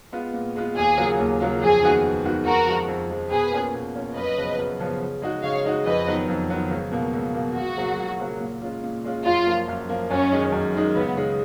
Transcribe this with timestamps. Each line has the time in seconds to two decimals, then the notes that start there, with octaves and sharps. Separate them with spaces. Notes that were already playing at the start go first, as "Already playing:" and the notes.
0.12 G#3 B3 F4
0.34 A#2
0.56 G#3 B3 F4
0.77 D#2 G#4
0.98 C#3 F#3 A#3 F4
1.19 D#2
1.40 C#3 F#3 A#3 F4
1.62 F2 G#4
1.82 D#3 G#3 B3 F#4
2.03 F2
2.25 D#3 G#3 B3 F#4
2.46 F2 F#4 A#4
2.67 F3 G#3
2.88 F2
3.10 F3 G#3
3.31 B2 G#4 B4
3.52 A#3 C#4 F4
3.74 B2
3.95 A#3 C#4 F4
4.16 F#2 B4 D#5
4.37 C#3 F3 B3
4.59 F#2
4.79 C#3 F3 B3
5.01 C#3
5.22 G#3 D#4 F#4
5.43 C#3 C#5 F5
5.64 G#3 D#4 F#4
5.86 F2 B4 D#5
6.07 D#3 F#3 B3
6.28 F2
6.50 D#3 F#3 B3
6.71 C#2
6.92 B2 A#3
7.13 C#2
7.34 B2 A#3
7.56 C#2 F#4
7.77 C#3 F#3 A#3
7.99 C#2
8.20 C#3 F#3 A#3
8.40 A#2
8.62 G#3 C#4 F4
8.84 A#2
9.04 G#3 C#4 F4
9.25 F#2 F4
9.47 F3 A#3
9.68 F#2
9.89 F3 A#3
10.11 F#2 C#4
10.32 D#3 G#3 D#4
10.52 F#2
10.74 D#3 G#3 D#4
10.95 C#2 B3
11.17 C#3 G#3 D#4